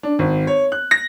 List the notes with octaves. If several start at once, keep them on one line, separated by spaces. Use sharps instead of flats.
D4
G#1
C#5
F#6
A#6